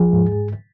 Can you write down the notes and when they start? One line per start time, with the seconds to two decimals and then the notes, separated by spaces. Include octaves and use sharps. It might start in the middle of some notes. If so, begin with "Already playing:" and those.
Already playing: D#2 F3 G#4
0.13 G#2